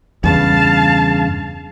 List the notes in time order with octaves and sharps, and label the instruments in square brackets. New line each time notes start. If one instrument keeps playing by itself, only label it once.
[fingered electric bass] E2 G2 C#3 [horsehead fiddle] F5 A5